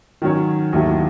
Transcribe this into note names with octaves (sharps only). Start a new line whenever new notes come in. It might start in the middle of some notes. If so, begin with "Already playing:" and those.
D#3 F#3 C#4
D#2 D#3 F#3 A3 E4